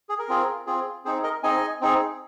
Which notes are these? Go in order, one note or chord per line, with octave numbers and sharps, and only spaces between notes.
G#4
A#4
C4 F4 G#4
C4 F4 G#4
C4 D#4 G#4 C5
A#4 D#5
C4 D#4 G#4 D#5 G#5
C4 D#4 G#4